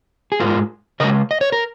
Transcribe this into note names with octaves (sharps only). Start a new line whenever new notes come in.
G#4
G#2 G#3 F4 A#4
C#3 G#3 A#4 D#5
D#5
C#5
A#4